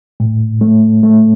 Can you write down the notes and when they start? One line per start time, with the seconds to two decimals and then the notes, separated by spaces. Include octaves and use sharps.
0.20 A2
0.61 A3
1.03 A3